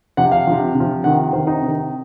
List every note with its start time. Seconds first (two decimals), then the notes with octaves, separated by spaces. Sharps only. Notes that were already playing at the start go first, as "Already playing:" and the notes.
0.17 C3 F3 F#5
0.32 F5
0.47 C3 F3
0.75 C3
0.80 F3
1.04 C3 D#3 F#5
1.33 C3 D#3 C5
1.47 D#4
1.62 C3 D#3